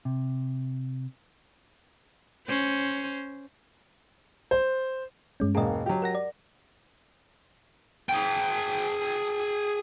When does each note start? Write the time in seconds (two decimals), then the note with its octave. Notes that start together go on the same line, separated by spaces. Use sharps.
0.05 C3
2.46 C#4 C5
4.51 C5
5.40 G2 G#3 C#4
5.55 E1 A#3 G#4 D#5
5.86 F#3 G4
6.02 A#4 F#5 A#6
6.15 D5
8.09 G#4 G5